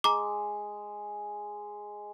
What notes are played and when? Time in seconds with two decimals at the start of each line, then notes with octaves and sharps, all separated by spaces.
0.04 G#3 A#5 D6